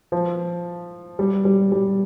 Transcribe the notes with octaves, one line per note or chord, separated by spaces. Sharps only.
F3
G3
G3
G3